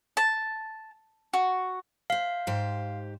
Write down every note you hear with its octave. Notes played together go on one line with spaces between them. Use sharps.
A5
F#4
C5 E5 F5
G#2 G4 C5